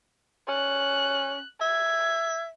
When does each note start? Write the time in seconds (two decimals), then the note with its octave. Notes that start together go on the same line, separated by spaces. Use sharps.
0.49 C#4 F#6
1.61 E5 G#6